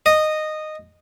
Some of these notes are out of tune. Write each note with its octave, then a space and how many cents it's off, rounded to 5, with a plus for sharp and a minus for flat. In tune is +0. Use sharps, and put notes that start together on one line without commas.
D#5 -10